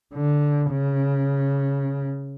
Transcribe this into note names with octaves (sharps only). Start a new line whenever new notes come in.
D3
C#3